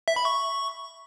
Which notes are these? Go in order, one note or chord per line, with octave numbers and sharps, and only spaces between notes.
E5
B5
C#6